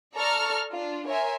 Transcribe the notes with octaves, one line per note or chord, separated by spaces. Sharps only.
A4 D5 A#5 C#6 F6
D4 F4
A#4 C#5 E5 G#5 C6